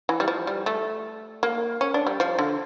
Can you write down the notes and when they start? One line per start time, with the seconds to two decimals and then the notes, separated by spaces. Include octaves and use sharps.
0.09 E3
0.20 G3
0.28 F3
0.47 G3
0.66 A3
1.43 A#3
1.81 C#4
1.94 D4
2.07 G3
2.20 F3
2.39 D3